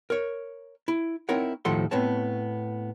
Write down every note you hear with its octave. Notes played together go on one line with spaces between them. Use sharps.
A#4 C#5
E4
C4 D#4 E4 A#4 C#5 F#5
D#2 A2 F3 A4 F#5 C6
A2 B3 C4 C#5 A5